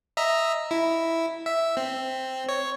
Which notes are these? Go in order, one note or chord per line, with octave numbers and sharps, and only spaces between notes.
D#5 E5 A#5
E4
E5
C4
C#5